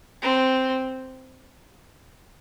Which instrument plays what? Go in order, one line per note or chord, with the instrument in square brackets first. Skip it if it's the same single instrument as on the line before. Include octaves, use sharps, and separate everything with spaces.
[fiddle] C4